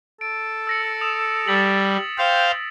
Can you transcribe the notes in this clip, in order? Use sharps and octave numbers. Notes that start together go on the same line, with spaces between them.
A4 D7
E6 A#6 C#7
D#6 E7
G3 A6 B6 F#7
C5 F5 G5